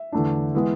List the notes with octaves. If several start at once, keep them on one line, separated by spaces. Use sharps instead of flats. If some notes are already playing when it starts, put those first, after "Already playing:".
Already playing: E5
E2 D3 A3 D4
E3 G#3 B3